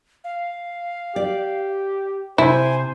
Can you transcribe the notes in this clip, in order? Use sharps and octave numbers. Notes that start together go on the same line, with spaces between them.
F5
G4 D5
C3 E4 C5 G#5